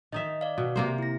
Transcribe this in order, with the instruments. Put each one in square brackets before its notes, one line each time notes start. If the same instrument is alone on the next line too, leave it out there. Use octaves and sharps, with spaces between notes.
[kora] D#3 D#4 E5 [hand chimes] D#5
[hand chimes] D5 F5
[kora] B2
C3 A#3 C5
[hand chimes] E4 A#6